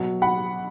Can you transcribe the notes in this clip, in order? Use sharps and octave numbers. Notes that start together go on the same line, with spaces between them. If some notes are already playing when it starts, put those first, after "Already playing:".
Already playing: B2 F#3
F#5 B5